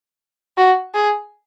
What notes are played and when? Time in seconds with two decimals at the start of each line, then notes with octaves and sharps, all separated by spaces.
0.57 F#4
0.94 G#4